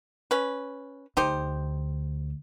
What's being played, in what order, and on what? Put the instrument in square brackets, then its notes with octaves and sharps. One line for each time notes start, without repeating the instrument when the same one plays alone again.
[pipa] C#4 B4
[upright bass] D2 [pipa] D#4 G4 C5